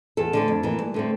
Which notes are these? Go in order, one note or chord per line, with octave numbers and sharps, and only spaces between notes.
E2 A4
D3 A3 C4
F2
E3 A#3
G2
D3 A3 C4